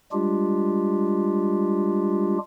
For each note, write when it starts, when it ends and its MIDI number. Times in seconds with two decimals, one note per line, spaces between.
0.12 2.38 55
0.12 2.38 56
0.12 2.38 62
0.12 2.38 65
0.12 2.38 67